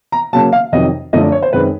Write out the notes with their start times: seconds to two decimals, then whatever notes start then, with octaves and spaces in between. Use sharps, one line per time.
0.12 A#5
0.33 C#3 F#3 A#3 A5
0.53 F5
0.72 F2 C3 D#3 F#3 D#5
1.13 F#2 D3 F3 A3 C4 D#5
1.23 D5
1.32 C#5
1.43 C5
1.53 F#2 D#3 G#3 C4 B4